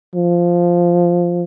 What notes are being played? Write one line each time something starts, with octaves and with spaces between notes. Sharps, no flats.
F3